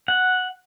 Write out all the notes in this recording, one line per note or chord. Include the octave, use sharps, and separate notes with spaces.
F#5